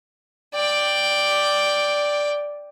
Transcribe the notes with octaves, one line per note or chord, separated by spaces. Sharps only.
D5 G5